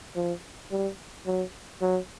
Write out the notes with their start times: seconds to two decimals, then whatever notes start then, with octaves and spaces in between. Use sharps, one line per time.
0.16 F3
0.71 G3
1.26 F#3
1.81 F#3